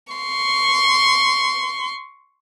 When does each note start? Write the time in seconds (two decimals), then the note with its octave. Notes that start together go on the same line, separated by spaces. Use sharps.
0.13 C6 C#6